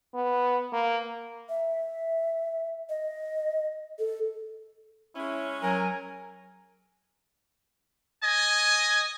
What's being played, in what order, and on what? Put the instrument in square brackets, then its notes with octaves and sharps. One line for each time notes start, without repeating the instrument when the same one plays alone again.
[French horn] B3
A#3
[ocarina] E5
D#5
A4
[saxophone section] G#3 C#4 [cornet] E4
[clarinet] F#3 [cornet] A#4 [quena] G#5
[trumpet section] D#5 G#5